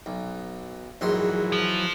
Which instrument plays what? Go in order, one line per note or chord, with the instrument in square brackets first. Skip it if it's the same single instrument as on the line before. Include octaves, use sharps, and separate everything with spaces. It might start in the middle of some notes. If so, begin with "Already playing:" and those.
[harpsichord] B1
[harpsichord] A#1 G#2 C6 [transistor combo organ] E3 F#3
[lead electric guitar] F3